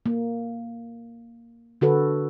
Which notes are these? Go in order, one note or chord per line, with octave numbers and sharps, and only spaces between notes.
A#3
D3 F#4 A4 B4